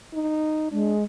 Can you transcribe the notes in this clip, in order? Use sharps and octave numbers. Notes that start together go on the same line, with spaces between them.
D#4
G#3 D4